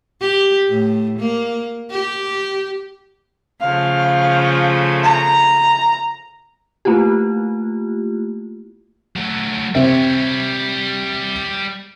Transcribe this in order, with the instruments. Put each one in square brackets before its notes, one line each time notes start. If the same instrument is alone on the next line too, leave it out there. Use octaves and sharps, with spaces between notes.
[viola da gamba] G4
A2
A#3
G4
[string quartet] C#3 F3 A3 [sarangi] F5
[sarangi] A#5
[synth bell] A3 A#3 E4 F4 G4
[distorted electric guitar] F#3 A3
[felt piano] C3 C4 E5 [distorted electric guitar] G3 C#5